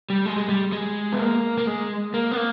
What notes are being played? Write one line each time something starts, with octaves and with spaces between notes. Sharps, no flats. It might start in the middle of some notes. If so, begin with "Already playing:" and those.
G3
G#3
G#3
G3
G#3
B3
A#3
A#3
G#3
A#3
B3
A#3